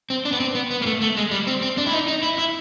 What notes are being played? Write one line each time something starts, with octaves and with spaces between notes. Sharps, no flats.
C4
D4
B3
C4
B3
B3
A#3
A3
A3
G#3
G3
C4
C4
D4
E4
D#4
D#4
E4
E4